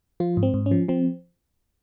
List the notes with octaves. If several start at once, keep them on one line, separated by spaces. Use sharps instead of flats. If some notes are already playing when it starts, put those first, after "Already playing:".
F3 F4
G#2
C4
G#2
C#4
F3
F3 C4